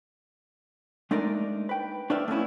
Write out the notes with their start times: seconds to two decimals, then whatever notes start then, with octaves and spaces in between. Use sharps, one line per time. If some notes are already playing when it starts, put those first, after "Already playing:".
1.11 G#3 A3 D4 D#4 A#4 D5
1.69 B4 G5
2.10 D4 B4 D5 E5 F5 G5
2.28 A3 B3 C#4 E4